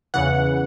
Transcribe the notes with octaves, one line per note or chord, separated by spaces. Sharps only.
E2 C#3 E3 F#5